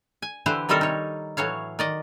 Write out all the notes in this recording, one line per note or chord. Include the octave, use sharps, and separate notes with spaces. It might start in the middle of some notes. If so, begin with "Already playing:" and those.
G#5
D3 E3 E4 G4 B4 C5
C3 D#3 G3 C4 A4 A#4
D#4 C#5
A2 E3 F#3 C#5 F5
D#3 D5 D#5